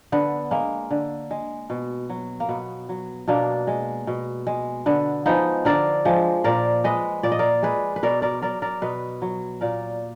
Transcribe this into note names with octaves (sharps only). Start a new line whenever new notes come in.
D3 B3
G#3 A#3
D3
G#3
B2
F#3
A#3
B2 B3
F#3
B2 A#3 D4
G#3
B2
G#3
D3 B3
F3 G#3 B3 D#4
D3 A#4 D5
F3 G#3
A#2 A#4 D5
G#3 B4 D#5
A#2 D5
D#5
A#4 D5
G#3 G#4 B4
B4
B2 A#4 D5
A#4 D5
F#3 A#4 D5
A#4 D5
B2 B4 D#5
F#3
A#2 A#4 D5